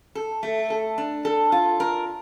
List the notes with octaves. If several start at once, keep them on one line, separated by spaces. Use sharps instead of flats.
A4
A3
A4
D4
A4
F4
A#4